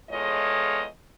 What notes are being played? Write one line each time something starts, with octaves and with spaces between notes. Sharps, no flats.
E2 G#3 F4 A4 C#5 D#5